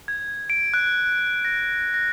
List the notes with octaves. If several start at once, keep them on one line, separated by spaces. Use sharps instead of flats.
G#6
D7
F#6
A#6
A#6